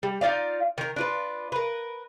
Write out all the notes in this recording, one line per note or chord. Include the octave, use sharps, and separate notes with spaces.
G3
D#4 F4 D5 F5
D#3 A#4
D4 F4 B4
A#4 B4